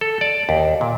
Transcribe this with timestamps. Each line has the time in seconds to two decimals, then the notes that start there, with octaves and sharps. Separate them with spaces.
0.01 A4
0.21 D5
0.49 D#2
0.81 A#2